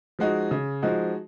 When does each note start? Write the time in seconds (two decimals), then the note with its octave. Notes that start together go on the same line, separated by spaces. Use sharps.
0.19 F3 G#3 D#4 F#4
0.51 C#3
0.82 F3 G#3 D#4 F#4